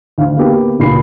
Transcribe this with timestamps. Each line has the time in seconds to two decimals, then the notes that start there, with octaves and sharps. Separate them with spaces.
0.18 D2 F5
0.37 A#3 B3 G4
0.79 C#2 A#2 B5 C7